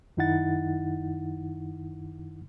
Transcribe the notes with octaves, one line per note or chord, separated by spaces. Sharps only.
F#2 D#3 D#4 E4 F#5 A6